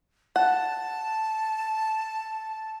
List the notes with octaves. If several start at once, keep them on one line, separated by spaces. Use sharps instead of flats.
F#5 A5